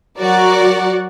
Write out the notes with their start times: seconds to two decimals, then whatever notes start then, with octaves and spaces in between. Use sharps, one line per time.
0.19 F#3 F#4 A#4 D5 F#5